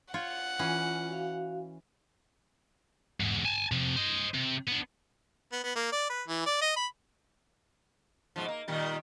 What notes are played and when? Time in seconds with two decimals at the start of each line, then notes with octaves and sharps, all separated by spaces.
0.14 F4 C#5 F#5
0.59 E3 C#4 F4
1.09 F#4 F5
3.20 E2 G#2
3.45 G#5 A5
3.72 C3 F3
3.96 C5 D#5
4.34 C3
4.68 B3 D4
5.52 B3
5.64 B3
5.75 A#3
5.92 D5
6.10 B4
6.28 E3
6.46 D5
6.61 D#5
6.76 B5
8.36 G#2 B2 F3
8.48 A#3
8.68 A#2 D#3 G3